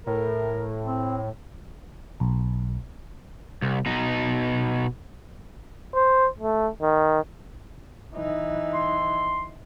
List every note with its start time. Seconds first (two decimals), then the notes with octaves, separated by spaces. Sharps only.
0.07 A2 A#4
0.85 C4
2.20 B1
3.62 C2
3.86 B2 D#4
5.94 C5
6.39 A3
6.81 D#3
8.15 E3 D#4
8.74 C6